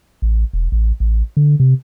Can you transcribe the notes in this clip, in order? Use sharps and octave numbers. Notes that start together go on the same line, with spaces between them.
A1
E1
A1
A1
D3
C3